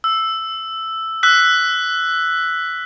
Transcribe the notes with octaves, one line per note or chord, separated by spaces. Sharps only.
E6
E6 F#6 B6